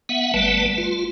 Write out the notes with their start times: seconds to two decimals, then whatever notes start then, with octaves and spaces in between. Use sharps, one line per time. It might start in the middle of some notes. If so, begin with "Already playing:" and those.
0.09 B3 E5 F#5
0.34 G1 G3 A3 B4 A5
0.78 F4